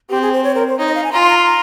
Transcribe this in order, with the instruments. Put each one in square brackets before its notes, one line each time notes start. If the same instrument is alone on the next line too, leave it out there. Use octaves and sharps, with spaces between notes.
[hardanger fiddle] C4 [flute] G4
[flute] G#4
C5
C#5
A#4
C5
[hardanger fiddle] D#4 [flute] C#5
[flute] D#5
F5
G#5
[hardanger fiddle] F4 [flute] A#5
[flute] C6
A#5
C6
A#5